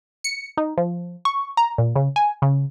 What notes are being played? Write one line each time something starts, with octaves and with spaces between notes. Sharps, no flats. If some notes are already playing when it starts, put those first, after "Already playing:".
C#7
D#4
F3
C#6
A#5
A#2
C#3
G#5
C#3